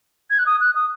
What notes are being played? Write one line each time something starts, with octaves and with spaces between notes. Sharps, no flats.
G#6
F#6
D#6
F#6
D#6